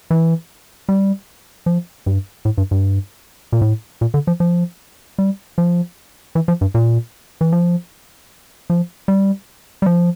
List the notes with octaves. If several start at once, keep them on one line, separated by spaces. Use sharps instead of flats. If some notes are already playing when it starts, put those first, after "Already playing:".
E3
G3
F3
G2
A2
G2
G2
A#2
A2
A#2
D3
F3
F3
G3
F3
E3
F3
G2
A#2
E3
F3
F3
G3
G3
F3